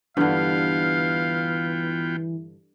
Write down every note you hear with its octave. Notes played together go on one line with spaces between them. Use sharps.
G2 D3 E3 B3 F4 F5 G5